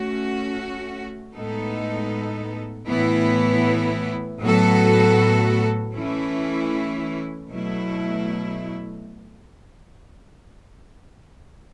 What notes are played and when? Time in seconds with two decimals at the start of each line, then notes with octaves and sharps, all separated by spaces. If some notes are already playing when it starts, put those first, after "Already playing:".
Already playing: A3 C#4 F#4
1.35 A2 G#3 B3 D#4 A4
2.88 A2 E3 B3 E4
4.42 A2 F#3 B3 F#4 A4
5.95 E3 A3 C#4 E4
7.49 B2 F#3 A3 E4